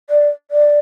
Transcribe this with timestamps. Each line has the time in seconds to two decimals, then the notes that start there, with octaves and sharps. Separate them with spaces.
0.10 D5
0.51 D5